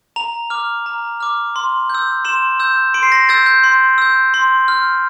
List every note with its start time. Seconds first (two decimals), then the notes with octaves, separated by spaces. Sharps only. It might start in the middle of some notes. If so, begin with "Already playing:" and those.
0.16 A#5 F7
0.50 D6 F6
0.86 A#5
1.20 D6 F6
1.56 C6
1.90 E6 G6
2.25 C6 E7
2.60 E6 G6
2.94 C6 D7
3.03 C7
3.12 A#6
3.29 E6 G6 A6
3.46 G6
3.64 C6
3.98 E6 G6
4.34 C6
4.68 F6